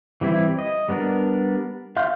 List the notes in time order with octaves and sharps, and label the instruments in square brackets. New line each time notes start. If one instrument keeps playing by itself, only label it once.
[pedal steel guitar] E3 G3 C4 E4
D#5
G3 B3 D4 A#4
E5 F5 C6 F6 G6